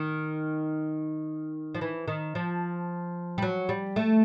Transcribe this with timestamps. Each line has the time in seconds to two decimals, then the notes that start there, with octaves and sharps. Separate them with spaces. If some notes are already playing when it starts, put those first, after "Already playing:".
Already playing: D#3
1.75 F3
1.81 E3
2.08 D#3
2.35 F3
3.38 G3
3.42 F#3
3.69 G3
3.96 A3